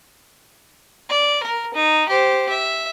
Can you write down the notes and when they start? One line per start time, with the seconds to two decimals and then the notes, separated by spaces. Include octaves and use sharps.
1.10 D5
1.43 A#4
1.74 D#4
2.09 G4 C5
2.50 E5